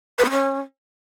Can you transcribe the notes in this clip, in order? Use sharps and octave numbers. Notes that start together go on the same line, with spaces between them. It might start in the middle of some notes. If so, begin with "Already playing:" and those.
B4
B3
C#4